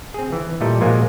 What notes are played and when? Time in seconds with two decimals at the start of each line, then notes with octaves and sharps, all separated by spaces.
0.14 C4 G#4
0.32 E3
0.61 A#2 G3 A3 E4 A4 D#5
0.81 A#2 F3 F#3 G#3 A#3 G#5